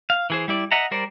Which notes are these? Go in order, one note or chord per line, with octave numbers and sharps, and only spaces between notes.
F5
E3 G#4 C5
G3 E4 D5
D#5 E5 F#5 A#5
G3 A#4 C5 D5